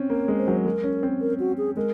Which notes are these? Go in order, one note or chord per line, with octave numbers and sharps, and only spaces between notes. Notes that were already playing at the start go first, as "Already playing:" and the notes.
Already playing: C4 C#4
A#3 C#5
G#3
C5
F#3
G#3 A#4
C#4
C4
A#4
F#4
G#4
G#3 A#4